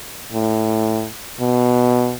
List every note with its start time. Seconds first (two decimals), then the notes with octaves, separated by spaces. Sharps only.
0.33 A2
1.41 B2